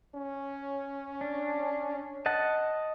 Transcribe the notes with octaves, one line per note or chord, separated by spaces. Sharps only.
C#4
D4
D#5 F#5 A5